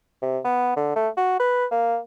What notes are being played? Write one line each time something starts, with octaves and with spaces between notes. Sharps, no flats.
C3
B3
D3
A3
F#4
B4
A#3